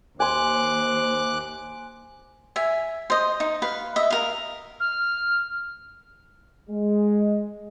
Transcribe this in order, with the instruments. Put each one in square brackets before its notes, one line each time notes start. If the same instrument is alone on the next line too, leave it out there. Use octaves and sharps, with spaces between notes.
[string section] D#2 [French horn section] C5 [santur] G#5 C6 [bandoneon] D6 F#6
[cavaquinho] E5 G#5
C5 D#5
D#4
B4 F5
D#5 E5
A#4 F5
[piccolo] F6
[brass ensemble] G#3